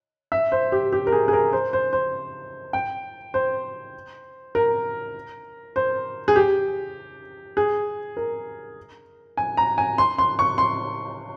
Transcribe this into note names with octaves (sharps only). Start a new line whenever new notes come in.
E5
C5
G4
G4
A#4
G#4
G#4
A#4
C5
C5
C5
G5
C5
A#4
C5
G#4
G4
G#4
A#4
G#5
A#5
G#5
C6
C6
C#6
C6